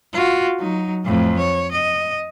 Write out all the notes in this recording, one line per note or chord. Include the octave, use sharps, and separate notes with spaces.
F4 F#4
F#3 D#4
F2 A2
C#5
D#5